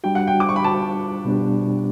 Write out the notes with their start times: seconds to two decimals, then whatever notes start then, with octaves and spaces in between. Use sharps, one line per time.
0.04 G3 D4 F#4 G5
0.15 F#5
0.27 G5
0.40 D6
0.49 C#6
0.56 B5
0.64 A5
1.25 B2 G3 B3 D4 G4